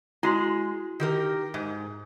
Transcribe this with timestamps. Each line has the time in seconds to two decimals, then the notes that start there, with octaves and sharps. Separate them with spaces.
0.23 G#3 E4 F#4 C6
1.00 D#3 G4 A#4
1.54 G#2